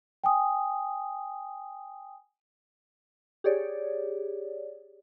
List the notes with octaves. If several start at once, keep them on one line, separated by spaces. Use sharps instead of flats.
G5 G#5 D#6
G4 G#4 C#5 D5